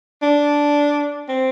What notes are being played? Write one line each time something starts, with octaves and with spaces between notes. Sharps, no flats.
D4
C4